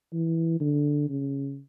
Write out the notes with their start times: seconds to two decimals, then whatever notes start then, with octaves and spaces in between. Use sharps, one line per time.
0.13 E3
0.60 D3
1.09 C#3